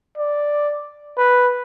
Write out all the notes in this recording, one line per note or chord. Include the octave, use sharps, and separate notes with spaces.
D5
B4